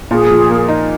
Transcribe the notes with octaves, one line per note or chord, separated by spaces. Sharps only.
A#2 G#4
F3
A#3
D#4